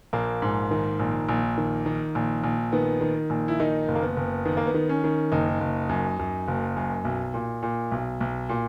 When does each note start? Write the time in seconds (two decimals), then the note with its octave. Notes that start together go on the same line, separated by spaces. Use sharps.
0.13 A#1 A#3
0.42 G#2
0.71 D#3
1.00 A#1
1.29 A#1
1.58 D#3
1.86 D#3
2.15 A#1
2.44 A#1
2.72 D#3 B3
3.01 D#3
3.30 A#1
3.48 E4
3.60 D#3 D#4
3.88 F#1
3.95 A#3
4.02 B3
4.17 F#1
4.45 D#3 B3
4.57 A#3
4.67 B3
4.74 D#3
4.89 C#4
5.04 D#3
5.32 F#1 D#4
5.61 F#1
5.89 F#2
6.19 F#2
6.48 F#1
6.77 F#2
7.05 B1
7.34 A#2
7.63 A#2
7.92 B1
8.20 B1
8.49 A#2